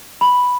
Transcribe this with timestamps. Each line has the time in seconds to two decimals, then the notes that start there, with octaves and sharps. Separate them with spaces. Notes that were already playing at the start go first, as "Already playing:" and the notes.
0.21 B5